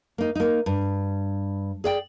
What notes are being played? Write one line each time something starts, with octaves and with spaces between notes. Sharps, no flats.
A#3 D#4
A#3 D#4
G2
G#4 D5 G5